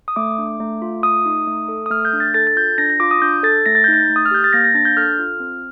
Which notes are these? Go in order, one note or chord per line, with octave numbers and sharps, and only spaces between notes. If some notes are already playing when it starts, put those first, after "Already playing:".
D#6
A3 D6
D4
A3
F4
A3 D#6
D#4
A3
A4
D#6
A3 F6
G6
D4
A6
A4 A6
A6
F4 G6
D4 A#6
A#6
F4 D6
D#6
D4 G6
A4 A6
A3 A#6
A6
D#4 G6
A6
A3
D#6
F6
G4 G6
A6
A#3 A#6
A#6
D4 A6
G6
A4 F6
F4
C4